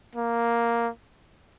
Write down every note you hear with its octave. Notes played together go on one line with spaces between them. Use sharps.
A#3